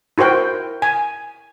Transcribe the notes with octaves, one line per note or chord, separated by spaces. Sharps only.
E4 F#4 A#4 C5 G5
G#5